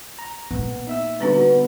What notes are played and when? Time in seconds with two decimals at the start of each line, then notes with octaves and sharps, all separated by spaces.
0.19 A#5
0.51 A#2 B3
0.87 D#4 E5 E6
1.21 D3 G3 B3 D4 D#4 F#4